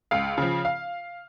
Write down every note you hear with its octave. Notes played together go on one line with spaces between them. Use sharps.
C#2 F5
C#3 F3
F5